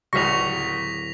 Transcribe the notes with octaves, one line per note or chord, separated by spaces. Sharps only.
D1 C#2 F#3 G3 C#6 A#6 B6 F7